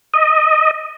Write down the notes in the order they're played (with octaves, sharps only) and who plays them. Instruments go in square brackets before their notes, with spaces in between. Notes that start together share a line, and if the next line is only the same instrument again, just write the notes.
[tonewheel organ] D#5